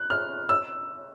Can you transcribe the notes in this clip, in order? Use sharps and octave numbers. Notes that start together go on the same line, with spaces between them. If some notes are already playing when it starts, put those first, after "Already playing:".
Already playing: F#6
F6
E6